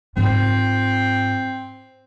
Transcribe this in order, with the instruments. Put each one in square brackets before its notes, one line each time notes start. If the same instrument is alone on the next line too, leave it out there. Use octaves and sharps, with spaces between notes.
[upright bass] G#2 F4 [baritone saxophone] C4